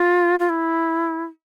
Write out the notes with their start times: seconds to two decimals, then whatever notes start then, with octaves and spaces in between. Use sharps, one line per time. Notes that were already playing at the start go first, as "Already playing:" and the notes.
Already playing: F4
0.39 F4
0.49 E4